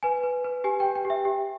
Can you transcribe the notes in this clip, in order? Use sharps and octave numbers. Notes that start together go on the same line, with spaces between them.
B4 G#5
B4
B4
G4 G#5
G4 G5
G5
G4
E5
G4